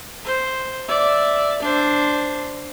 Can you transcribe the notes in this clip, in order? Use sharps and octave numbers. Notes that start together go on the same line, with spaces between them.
C5
D5 E5
D4 C5